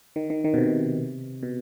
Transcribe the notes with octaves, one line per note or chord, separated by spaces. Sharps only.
D#3
D#3
D#3
B2
C3
B2